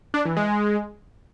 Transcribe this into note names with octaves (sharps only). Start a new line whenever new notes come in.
D4
E3
G#3